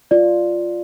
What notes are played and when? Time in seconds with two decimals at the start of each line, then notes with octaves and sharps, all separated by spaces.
0.11 F4 D5